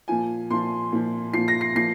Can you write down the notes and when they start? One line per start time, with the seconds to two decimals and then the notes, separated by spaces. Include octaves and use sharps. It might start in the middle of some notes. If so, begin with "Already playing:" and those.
0.08 A#2 F3 G#5
0.50 A#2 F3 C6
0.92 A#2 F3
1.33 A#2 F3 C7
1.48 A#6
1.61 C7
1.75 A#2 F3 C7